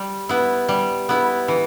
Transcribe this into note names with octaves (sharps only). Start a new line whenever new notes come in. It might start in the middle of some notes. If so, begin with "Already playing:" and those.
Already playing: G3
B3 E4
G3
B3 E4
E3